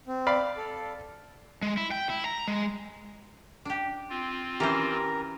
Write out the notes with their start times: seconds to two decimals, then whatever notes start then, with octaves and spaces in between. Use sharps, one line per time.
0.07 C4
0.27 D5 F5 B5
0.57 A4
1.62 G#3
1.77 E4
1.92 G5
2.10 E4
2.25 A#5
2.48 G#3
3.65 D4 G4
4.10 C4 F4
4.60 E3 C#4 G4 A#4 C5 A#5